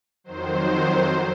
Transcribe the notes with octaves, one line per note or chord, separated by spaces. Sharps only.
F2 D#3 F#3 C5